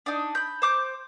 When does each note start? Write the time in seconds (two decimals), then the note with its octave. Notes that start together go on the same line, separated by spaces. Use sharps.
0.06 D4 D#4
0.35 B5 G6
0.62 C5 D6 G6